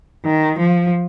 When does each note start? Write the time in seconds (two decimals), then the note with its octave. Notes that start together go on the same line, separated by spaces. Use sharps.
0.25 D#3
0.59 F3